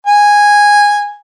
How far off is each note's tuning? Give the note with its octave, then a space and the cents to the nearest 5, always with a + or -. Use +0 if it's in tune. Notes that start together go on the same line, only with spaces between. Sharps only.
G#5 -10